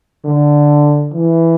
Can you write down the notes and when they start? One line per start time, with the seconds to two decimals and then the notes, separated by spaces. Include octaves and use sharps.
0.25 D3
1.13 E3